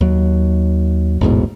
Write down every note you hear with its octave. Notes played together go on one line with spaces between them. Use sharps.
D#2 F#3
A1 E2 G#2 B2